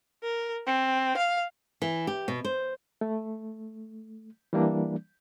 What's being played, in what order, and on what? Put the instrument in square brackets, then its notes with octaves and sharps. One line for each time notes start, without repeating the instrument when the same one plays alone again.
[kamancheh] A#4
C4
F5
[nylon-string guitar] E3
G4
B2
C5
[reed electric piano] A3
E3 G3 A#3 D4